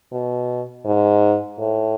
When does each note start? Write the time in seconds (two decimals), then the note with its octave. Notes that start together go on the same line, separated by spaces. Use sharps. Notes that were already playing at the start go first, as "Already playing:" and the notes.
0.12 B2
0.85 G#2
1.59 A2